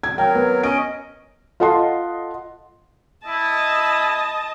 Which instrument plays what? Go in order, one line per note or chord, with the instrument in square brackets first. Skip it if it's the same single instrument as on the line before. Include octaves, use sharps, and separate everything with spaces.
[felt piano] G#6
[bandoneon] F#3 A#4 [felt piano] G5
[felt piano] B3
[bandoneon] C#4 D#5 [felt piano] D7
[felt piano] F4 A4 D#5 F#5 A5 C6
[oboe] E4 [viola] D#5 A5